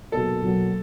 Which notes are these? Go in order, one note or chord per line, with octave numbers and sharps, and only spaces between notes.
B2 F#3 A#3 D#4 G#4 A4
B1 B2 F#3 A#3